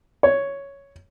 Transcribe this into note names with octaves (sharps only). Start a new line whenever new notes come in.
C#5